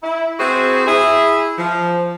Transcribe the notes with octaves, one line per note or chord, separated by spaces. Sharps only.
E4
C4 E4 F#4 G#4 C5
E4 G#4
F3